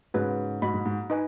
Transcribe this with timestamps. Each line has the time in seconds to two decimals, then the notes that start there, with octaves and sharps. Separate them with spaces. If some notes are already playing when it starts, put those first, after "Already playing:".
0.14 G#2 C#3 F#4 B4 D#5
0.62 G#2 F#4 D#5 B5
0.74 G#2
0.85 G#2
1.10 D#4 B4 D#5 G#5